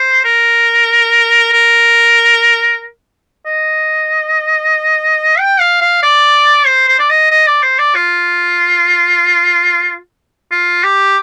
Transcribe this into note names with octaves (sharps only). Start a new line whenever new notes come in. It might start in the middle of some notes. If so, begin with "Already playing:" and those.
Already playing: C5
A#4
A#4
D#5
G5
F5
F5
D5
C5
C5
D5
D#5
D#5
D5
C5
D5
F4
F4
G4